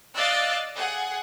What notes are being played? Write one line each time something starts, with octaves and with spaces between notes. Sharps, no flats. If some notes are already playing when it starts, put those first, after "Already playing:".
D5 D#5 F5 E6 F#6 A6
G#4 F#5